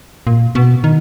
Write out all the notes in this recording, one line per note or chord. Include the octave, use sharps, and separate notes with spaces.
A#2
B2
D#3